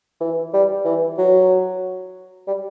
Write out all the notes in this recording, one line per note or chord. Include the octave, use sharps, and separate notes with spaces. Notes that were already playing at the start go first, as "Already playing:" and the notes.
E3
G3
E3
F#3
G3